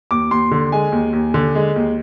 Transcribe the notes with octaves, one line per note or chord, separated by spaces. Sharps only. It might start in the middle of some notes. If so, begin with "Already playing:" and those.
D#2 D6
D#2 C6
D3
G#3 G#5
D#2
D#2
D3
G#3
D#2